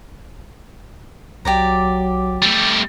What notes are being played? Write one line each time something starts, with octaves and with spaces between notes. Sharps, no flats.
B1 F#3 G4 D5 A#5
G3 A3